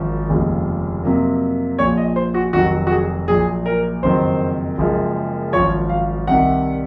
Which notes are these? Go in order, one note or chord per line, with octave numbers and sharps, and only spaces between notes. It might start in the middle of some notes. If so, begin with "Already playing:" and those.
Already playing: G#1 F#2 F3
F1 D#2 C#3 F3 G#3
F2 C3 F#3 A#3
A#1 A#2 F3 C#5
D#5
C5
F#4
F1 F2 D#3 F#3 F#4
F#4
G#4
A#1 A#2 F#3 G#4
A#4
F#1 F2 D#3 F#3 C5
F#1 F#2 F3 G#3
G#1 F#2 F3 C#5
F5
C2 C3 D#3 F#5